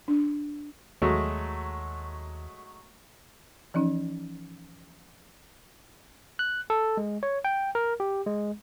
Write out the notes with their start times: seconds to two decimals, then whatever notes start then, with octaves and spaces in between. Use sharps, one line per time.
0.08 D4
1.02 D#2 F#3 G#3 A3
3.74 E3 F3 C#4 D#4
6.39 F#6
6.70 A4
6.97 G#3
7.23 C#5
7.45 G5
7.75 A#4
8.00 G4
8.27 G#3